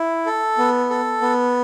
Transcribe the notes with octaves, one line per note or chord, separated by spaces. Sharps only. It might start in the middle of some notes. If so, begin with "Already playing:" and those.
Already playing: E4
A4
B3
A4
B3